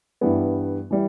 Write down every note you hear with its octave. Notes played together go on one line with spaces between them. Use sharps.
G2 E3 G3 B3
E3 G3